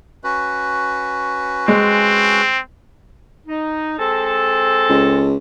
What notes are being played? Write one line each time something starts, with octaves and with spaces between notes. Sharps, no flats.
C#4 F#4 B4
G#3 C4
D#4
G#3 C4 A4
C#2